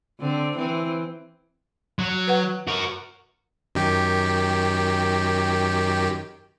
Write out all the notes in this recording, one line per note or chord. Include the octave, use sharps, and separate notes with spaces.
D3 C4
E3 C4
F#3
B4 F#5
F#4 A#4
F#2 D#3 G4